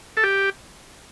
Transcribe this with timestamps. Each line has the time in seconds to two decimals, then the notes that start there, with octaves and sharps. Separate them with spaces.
0.17 A4
0.24 G4